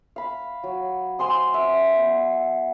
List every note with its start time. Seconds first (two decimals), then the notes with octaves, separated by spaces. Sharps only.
0.16 F5 B5
0.64 F#3
1.19 C5 G#5 C6 D#6
1.54 E5
1.96 B3